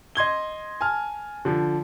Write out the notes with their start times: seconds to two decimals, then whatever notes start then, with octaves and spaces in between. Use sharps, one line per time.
0.15 D#5 C6 G#6 G7
0.81 G#5 A5 F6
1.45 D3 F3